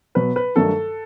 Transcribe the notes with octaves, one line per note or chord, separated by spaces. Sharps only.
B2 F#3 B3 B4
B4
G2 D#3 F#3 A3 A4